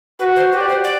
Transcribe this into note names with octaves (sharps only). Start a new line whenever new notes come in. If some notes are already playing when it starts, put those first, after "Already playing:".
F#4 B4
C5
G4 B4
D5
C5
D5